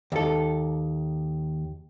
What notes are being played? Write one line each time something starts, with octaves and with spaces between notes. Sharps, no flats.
D#2 A4